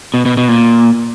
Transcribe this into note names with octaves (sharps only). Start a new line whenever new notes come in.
B2
B2
B2
A#2